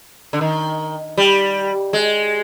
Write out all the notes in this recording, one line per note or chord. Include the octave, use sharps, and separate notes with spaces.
D3
D#3
G3
G#3